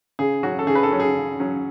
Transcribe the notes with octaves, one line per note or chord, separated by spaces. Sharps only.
C#3 G#4
F#3 C#4 F#4
A4
C#3 G#4
B4
A4
F#3 C#4
G#4
C#3
F#3 C#4